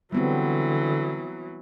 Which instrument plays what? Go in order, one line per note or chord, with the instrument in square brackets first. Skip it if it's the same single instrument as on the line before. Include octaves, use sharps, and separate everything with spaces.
[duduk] D3 [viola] E3 F#3 [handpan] G3 B3 C4